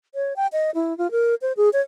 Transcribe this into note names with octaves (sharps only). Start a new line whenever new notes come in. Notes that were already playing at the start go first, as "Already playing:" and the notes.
C#5
G5
D#5
E4
F4
A#4
C5
G#4
C#5